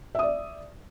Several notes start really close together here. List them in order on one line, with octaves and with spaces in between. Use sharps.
E5 D#6 D5